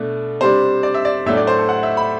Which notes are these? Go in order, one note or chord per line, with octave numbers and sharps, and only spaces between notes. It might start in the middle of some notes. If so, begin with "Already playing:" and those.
Already playing: B2 A3 D4
C3 G3 D4 C5
D5
E5
D5
A2 F#3 A3 D4 E5
D5
C5
A4
F#5
E5
B5